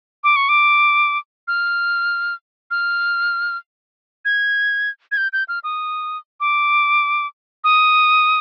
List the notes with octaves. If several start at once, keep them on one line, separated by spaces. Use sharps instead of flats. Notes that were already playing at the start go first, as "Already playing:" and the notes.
D6
C#6
D6
F6
F6
G#6
G#6
G6
G6
F6
D#6
D6
D#6